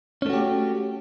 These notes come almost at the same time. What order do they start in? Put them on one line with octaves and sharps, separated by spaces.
C#4 A3 F#4 G4